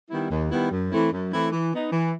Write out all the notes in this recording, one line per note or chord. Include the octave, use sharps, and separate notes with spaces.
D#3 G3 B3 E4
D#2
D#3 G3 B3 E4
F#2
E3 A3 C4 E4
F#2
E3 A3 C4 E4
E3
B3 D#4
E3